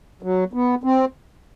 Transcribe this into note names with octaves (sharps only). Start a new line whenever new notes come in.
F#3
B3
C4